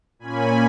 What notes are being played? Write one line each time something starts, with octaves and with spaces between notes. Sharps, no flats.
A#2 A#3 C#4 G#5 B5